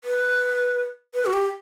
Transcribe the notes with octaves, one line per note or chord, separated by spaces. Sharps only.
B4
B4
F#4
G4